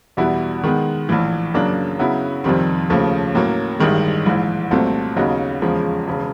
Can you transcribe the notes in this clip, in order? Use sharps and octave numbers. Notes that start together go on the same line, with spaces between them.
E2 B2 G3 B3 E4
D#3 G#3 B3
A#1 A2 E3
F#2 C#3 F#3 A#3 D4
C#3 F#3 B3 E4
F2 C3 D#3 G3 C4
D#2 C#3 F3 A3
A2 F#3 A#3 C#4
A1 G2 D#3 G#3
A#1 G#2 E3
C2 A#2 F#3 A3 C4
D#2 C#3 F#3 B3 D#4
E2 C#3 F3 G#3
E1 C#3